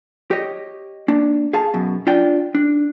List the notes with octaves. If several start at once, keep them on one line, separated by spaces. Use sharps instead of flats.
G4 C#5 D#5
A#3 D4
G#4 F5 A5
F#2 B2
D4 F4 D5 G5
D4